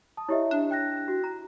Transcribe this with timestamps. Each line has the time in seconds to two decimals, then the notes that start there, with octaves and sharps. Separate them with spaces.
0.17 A5 D#6
0.29 E4 G4 C#5 D#5 E5
0.51 D4
0.71 G5 F#6 A#6
1.08 F#4
1.24 A#5